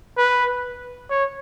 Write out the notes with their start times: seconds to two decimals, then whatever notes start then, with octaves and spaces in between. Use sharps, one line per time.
0.17 B4
1.10 C#5